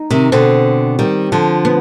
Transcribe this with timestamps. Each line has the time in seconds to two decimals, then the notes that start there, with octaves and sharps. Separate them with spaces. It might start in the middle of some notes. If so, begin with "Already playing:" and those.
Already playing: D#4
0.10 C3 D#3
0.32 B2 D3 C4
0.99 D#3 G3
1.32 D3 F3
1.65 B3